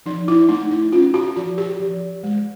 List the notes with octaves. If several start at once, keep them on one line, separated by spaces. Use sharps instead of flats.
F3 D#4
E4
A3 D#4
E4
C#4 F4
F#4
F3 F#4
G4
F3
G#3